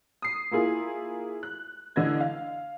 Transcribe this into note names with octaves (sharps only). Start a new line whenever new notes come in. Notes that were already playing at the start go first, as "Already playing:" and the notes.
D#6 C7
A#3 E4 F4 G#4
F#6
D3 E3 D#5 G#6
F5